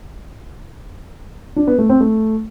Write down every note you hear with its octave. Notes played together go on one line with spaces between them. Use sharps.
D4
B3
A3
C4
A3